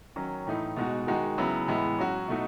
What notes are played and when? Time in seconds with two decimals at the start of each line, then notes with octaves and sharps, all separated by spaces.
0.16 D#3 F#3 C#4
0.47 A2 E3 A3 D#4
0.77 B2 G#3 D#4 F#4
1.07 D#3 G#3 D#4 F#4
1.38 C#3 F#3 B3 E4
1.68 A2 E3 G#3 B3 E4
1.99 F#3 C#4 F#4
2.28 B2 A3 D#4 F#4